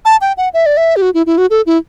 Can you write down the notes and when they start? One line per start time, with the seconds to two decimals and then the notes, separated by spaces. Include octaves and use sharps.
0.05 A5
0.21 G5
0.37 F#5
0.54 E5
0.66 D5
0.77 E5
0.96 G4
1.02 F#4
1.14 E4
1.26 E4
1.38 F#4
1.50 A4
1.66 E4